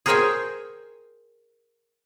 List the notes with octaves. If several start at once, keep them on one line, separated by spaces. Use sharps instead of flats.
G#4 A#4 C5 C#5 G5 G#5